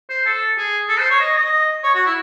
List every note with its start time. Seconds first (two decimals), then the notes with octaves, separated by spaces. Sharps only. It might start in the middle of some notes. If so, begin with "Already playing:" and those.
0.09 C5
0.25 A4
0.57 G#4
0.89 A4
0.99 C5
1.10 C#5
1.20 D#5
1.36 D#5
1.84 C#5
1.94 F#4
2.06 E4